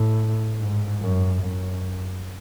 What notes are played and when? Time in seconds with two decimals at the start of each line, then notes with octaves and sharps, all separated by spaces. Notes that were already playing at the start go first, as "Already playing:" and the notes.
Already playing: A2
0.59 G#2
1.01 F#2
1.42 F#2